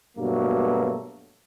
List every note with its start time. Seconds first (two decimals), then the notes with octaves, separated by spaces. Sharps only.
0.18 G2 B2 F#3 A3 A#3